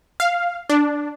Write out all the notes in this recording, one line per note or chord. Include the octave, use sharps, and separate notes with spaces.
F5
D4